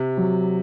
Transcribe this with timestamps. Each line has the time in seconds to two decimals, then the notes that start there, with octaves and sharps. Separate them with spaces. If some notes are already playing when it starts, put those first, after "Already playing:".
Already playing: C3
0.17 F#3